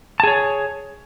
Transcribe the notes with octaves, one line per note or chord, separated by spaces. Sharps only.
G#4 C#5 A5